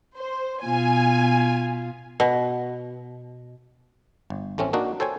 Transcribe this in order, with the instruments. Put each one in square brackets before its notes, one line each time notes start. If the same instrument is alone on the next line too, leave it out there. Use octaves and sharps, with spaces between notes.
[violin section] C5
[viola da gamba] B2 F4 [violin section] G#5
[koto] B2
[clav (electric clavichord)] G1
A1 A3 C4 C#4
A#3 D4 D#4 F#4
A4 C5 C#5 G5 G#5